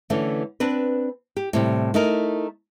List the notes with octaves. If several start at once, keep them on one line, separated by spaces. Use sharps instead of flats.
D3 E3 A3 C#4
C4 D4 B4
G4
A2 C3 G3
A3 D#4 E4 A#4